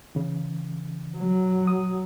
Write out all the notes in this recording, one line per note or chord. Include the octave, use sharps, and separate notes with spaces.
C#3 E3
F#3
D#6